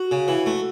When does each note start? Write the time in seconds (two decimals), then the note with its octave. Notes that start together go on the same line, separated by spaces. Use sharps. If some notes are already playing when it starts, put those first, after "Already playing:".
Already playing: F#4
0.11 C#3
0.28 E3
0.46 A3